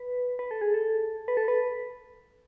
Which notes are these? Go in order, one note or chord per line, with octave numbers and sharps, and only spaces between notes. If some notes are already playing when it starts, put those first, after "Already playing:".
Already playing: B4
B4
A4
G#4
A4
B4
A4
B4